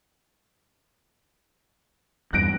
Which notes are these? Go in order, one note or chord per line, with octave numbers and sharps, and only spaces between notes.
E2 G2 E3 F#6 A#6 D7